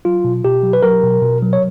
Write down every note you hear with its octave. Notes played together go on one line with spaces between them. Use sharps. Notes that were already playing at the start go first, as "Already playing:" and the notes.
F#3 F4
B2
B2 G4
F#3
B4
F#3 A#4
B2
B2
F#3
C#5